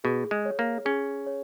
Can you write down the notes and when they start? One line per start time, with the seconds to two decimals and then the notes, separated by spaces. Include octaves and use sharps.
0.04 B2 G#4
0.31 G#3
0.45 C#5
0.59 A#3
0.85 C#4 G#4
1.27 C#5